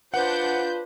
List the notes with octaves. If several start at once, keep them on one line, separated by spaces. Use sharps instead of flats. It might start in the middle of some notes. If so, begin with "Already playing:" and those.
D4 F4 B4 C5 F#5 G6